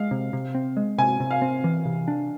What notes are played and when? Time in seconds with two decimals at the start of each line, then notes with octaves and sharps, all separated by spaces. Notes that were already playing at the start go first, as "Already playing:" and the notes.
Already playing: G#3 F5
0.11 C3
0.33 C3
0.54 C4
0.77 G#3
0.98 C3 G#5
1.20 C3
1.31 F5
1.42 C4
1.64 E3
1.85 C3
2.08 D4